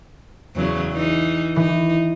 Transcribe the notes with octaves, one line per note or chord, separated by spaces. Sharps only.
E2 C#3 F#3
E3 D#4
E3 D#4